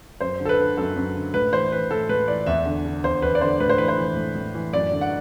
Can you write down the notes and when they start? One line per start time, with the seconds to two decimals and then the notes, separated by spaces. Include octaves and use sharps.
0.21 F#2 C5
0.40 D3
0.45 A4
0.49 B4
0.59 D3
0.77 F#2 A4
0.96 F#2
1.15 D3
1.34 A2 B4
1.53 E3 C5
1.72 E3 B4
1.91 A2 A4
2.09 A2 B4
2.28 E3 D5
2.47 E2 E5
2.66 D3
2.85 D3
3.04 E2 C5
3.22 E2 B4
3.35 D5
3.41 D3 C5
3.60 A2 B4
3.69 C5
3.78 E3 B4
3.88 C5
3.98 E3
4.17 A2
4.35 A2
4.54 E3
4.73 F#2 D5
4.92 D3
5.01 F#5